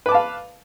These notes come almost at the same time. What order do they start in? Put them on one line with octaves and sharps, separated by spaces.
B4 D6 A5 F5